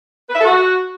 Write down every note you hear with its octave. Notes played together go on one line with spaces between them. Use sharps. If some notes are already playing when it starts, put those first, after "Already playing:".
B4
E5
A4
F#4